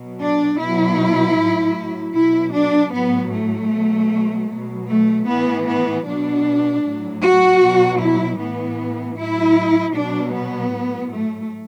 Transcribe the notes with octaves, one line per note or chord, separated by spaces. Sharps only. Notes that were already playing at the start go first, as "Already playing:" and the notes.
Already playing: B2 F#3
D4
B2 F#3 E4
A2 F#3
B2 F#3 E4
D4
A2 F#3 B3
A3
B2 F#3
B2 F#3
A3
A2 E3 B3
B3
B2 F#3 D4
A2 F#3
F#4
B2 F#3
E4
A2 E3 B3
A2 F#3 E4
B2 F#3 D4
B3
A2 F#3
A3